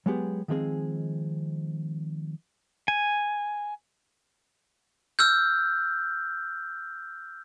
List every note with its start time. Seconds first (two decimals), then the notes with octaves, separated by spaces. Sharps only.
0.06 F#3 G#3 B3 G4 G#4
0.48 D#3 F3 G#3 C4 G#4
2.88 G#5
5.19 E6 F6 G6